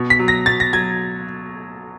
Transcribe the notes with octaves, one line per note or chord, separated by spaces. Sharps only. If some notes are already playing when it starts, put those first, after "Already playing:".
Already playing: B2
B6
F#3
A#6
B2 A6
A#6
F#3 G#6